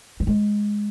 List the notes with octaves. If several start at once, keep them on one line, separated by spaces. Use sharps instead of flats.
G3
G#3